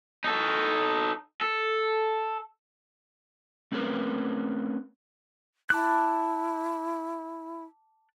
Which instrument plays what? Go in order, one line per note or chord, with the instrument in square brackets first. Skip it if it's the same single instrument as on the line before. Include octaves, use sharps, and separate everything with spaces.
[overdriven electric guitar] D#4 A4
A4
[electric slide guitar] A3 C4 C#4 G#4 A#4 B4
[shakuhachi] E4 [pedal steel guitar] A5 D6 F#6